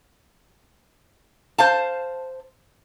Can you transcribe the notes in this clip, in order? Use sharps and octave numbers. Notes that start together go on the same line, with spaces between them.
C5 F5 A5